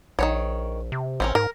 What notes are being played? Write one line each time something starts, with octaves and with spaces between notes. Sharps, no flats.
A#1 D#3 C4 C#5
C3
A1 C4 C#4 A#4
G#2 A#4